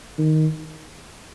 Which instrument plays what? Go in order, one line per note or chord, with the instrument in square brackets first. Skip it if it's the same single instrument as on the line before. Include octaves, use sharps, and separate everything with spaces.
[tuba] D#3